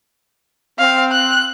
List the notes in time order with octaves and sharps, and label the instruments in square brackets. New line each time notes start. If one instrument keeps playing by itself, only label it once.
[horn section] C4 [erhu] F5
[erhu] F#6